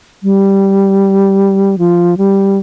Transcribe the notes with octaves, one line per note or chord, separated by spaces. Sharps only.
G3
F3
G3